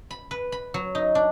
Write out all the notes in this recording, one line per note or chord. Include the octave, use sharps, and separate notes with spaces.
B5
B4
B5
F#3
D#4
D4